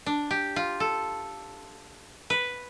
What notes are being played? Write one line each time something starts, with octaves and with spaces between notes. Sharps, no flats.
D4
G4
F4
A4
B4